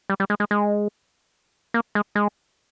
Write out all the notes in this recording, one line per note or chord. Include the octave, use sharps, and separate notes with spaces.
G3
G3
G#3
G#3
G#3
A#3
G#3
G#3